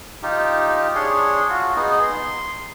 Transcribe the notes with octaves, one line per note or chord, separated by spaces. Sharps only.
D#4 F4 G4
D4 G#4 C#5 C6
F4 F#4
B3 D#4 G#4
C6